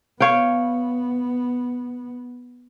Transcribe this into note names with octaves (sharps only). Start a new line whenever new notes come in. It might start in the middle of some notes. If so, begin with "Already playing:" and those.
B3 C#5 F5 G5